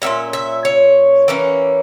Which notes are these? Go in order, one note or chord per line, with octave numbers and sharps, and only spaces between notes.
A#2 A#3 C#4 E5
E5
C#5
E3 A#3 C#4